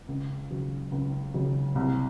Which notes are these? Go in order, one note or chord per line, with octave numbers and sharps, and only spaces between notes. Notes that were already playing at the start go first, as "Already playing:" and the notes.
C#2
C#3 F#3
C#2
C#3 F#3
C2